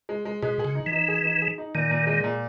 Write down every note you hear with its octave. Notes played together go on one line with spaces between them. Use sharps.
G#3
G#3
B2 G#3
G#4
C#3
D#4
E3
D#4
G#4
D#4
G#4
D#4
A#2 D#3
A#2
G#3
A#2